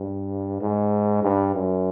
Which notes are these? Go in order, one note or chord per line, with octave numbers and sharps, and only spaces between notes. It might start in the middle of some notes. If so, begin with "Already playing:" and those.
Already playing: G2
G#2
G2
F#2